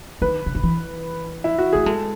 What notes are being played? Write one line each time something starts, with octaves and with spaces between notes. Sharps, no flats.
D#3 B4
C#3
D#3
E3
E4
F#4
A3 G#4
G#3 A4